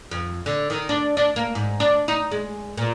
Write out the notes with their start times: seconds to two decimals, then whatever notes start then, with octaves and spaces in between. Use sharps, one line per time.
0.11 F2
0.46 D3
0.70 D#3
0.89 D4
1.17 D4
1.36 A#3
1.55 G#2
1.80 D4
2.08 D#4
2.32 G#3
2.77 A#2